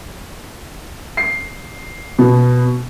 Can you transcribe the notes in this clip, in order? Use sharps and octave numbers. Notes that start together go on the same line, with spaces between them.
C7
B2